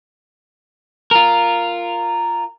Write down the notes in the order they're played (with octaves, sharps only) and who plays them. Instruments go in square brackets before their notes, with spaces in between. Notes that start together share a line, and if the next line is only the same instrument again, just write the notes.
[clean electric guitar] F4 A#4